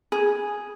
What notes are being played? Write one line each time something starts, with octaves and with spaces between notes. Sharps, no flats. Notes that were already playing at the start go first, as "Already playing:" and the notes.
G#4